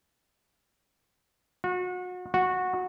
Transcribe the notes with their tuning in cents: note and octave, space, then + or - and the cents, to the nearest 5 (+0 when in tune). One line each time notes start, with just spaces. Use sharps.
F#4 -35
F#4 -15